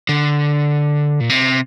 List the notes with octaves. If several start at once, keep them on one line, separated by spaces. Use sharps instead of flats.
D3
A#2
C3